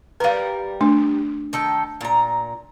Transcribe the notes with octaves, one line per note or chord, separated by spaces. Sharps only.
G3 A#4 B4 F5
A3 D4
D#3 A4 G5
A#2 A#5